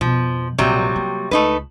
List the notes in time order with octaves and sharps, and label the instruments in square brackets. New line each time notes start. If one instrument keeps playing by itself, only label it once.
[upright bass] F2 B2 [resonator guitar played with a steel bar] F3
[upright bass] A#1 F2 [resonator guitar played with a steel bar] C3 F#3 G3
[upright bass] A#3
[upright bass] C#2 [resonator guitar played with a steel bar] A3 D#4 B4